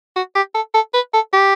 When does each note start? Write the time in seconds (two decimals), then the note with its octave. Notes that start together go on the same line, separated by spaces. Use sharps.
0.16 F#4
0.35 G4
0.55 A4
0.74 A4
0.94 B4
1.14 A4
1.33 G4